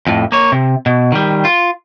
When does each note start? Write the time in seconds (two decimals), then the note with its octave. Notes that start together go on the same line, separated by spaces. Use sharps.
0.07 F2 A2
0.32 A#3 C#5
0.52 C3
0.86 B2
1.12 D#3 G3
1.45 F4